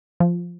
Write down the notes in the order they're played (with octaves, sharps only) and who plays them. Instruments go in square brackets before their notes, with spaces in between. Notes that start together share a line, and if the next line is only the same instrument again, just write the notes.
[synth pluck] F3